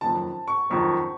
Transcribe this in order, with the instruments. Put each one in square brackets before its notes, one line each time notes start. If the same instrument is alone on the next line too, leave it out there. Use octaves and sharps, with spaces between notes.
[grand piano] F#1 F2 D#3 [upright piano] A5
[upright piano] C#6
[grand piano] F#1 F2 D#3 [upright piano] C#6